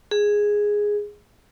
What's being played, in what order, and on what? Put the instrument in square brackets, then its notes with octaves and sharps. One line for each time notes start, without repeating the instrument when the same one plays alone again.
[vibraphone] G#4